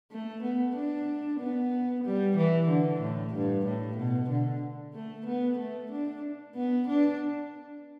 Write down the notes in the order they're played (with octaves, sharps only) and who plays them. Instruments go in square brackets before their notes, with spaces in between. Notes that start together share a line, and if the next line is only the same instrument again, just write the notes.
[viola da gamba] A3
B3
D4
B3
G3
E3
D3
A2
G2
A2
B2
D3
A3
B3
A3
D4
B3
D4